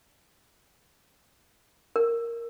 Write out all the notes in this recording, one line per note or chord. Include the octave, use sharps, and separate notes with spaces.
A#4